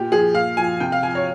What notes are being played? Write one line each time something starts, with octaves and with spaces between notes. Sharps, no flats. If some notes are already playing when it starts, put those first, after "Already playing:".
Already playing: A#2 G4
F3 G#4
A#2 F5
F3 G#5
C3 G5
F5
F3 G#5
C#5